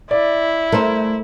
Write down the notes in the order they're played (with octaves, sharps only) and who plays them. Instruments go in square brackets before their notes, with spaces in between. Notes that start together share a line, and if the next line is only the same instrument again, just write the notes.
[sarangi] E4 [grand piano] D5
[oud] A3 [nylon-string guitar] A#4 C5